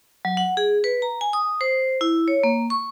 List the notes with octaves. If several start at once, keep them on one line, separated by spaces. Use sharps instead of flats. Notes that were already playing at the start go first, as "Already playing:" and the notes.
F#3
F#5
G#4
B4
A#5
G#5
D#6
C5
E4
C#5
A#3
C#6